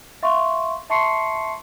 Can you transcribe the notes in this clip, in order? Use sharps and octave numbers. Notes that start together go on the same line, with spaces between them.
E5 F5 C6 C#6
E5 A5 C6 C#6 C7 C#7